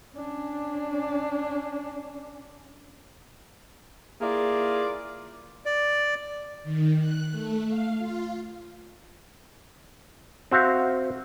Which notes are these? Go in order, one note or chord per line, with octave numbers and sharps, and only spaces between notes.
C#4 D4
A#3 E4 F4 G#4 D5
D5
D#3
F#6
A3
F5
F4
C4 F#4 E5 F5